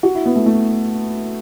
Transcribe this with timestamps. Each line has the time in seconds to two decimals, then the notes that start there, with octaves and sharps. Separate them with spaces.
0.03 F#4
0.15 E4
0.26 B3
0.36 A3
0.46 A3